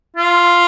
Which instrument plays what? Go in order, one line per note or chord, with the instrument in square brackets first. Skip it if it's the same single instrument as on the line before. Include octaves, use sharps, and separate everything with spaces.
[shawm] F4